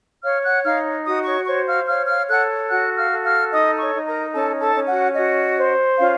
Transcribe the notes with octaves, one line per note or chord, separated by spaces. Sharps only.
C#5 F5 F6
F#5 F#6
D#4 F5 F6
F#4 D#5 D#6
C#5 C#6
C5 C#5 C#6
F5 F6
C#5 F5 F6
F5 F6
A4 F#5 F#6
F#4 F#5 F#6
F5 F6
A4
F5 F6
D#4 D#5 D#6
C#5 C#6
D#4
A#4 A#5
C#4 A4 A5
A4 A5
C#4
F#4 F#5
F#4 D#5
C5
C#4 F4 F5